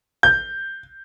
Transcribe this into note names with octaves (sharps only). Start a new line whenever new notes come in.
G6